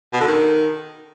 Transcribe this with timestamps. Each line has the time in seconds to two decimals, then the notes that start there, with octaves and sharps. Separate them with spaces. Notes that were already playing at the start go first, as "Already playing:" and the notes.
0.13 B2
0.20 D3
0.28 D#3